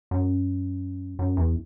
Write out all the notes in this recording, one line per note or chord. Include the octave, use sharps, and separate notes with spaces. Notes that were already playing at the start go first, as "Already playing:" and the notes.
F#2
F#2
E2